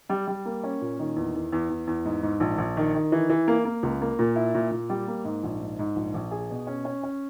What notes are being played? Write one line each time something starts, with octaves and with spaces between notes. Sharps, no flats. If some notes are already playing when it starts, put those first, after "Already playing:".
G3
G3
A#3
C#4
A#2
D#3
E2
E2
E2
E2
E2
G#2
G#2
A#1
A#1
D#3
D#3
E3
E3
A#3
A#3
C#2
A#3
A#2
E4
A#2
A#2
G3
A#3
G#2
A#1
G#2
G#2
A#1
A#1
G#4
B2
C#4
C#4
C#4